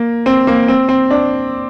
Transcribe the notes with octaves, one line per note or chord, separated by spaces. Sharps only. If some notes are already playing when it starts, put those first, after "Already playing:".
Already playing: A#3
C4
A#3
C4
C4
D4